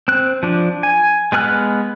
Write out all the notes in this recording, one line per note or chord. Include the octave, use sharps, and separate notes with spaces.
C4 F#6
F3 D4
G#5
G#3 B3 G#4 F6 F#6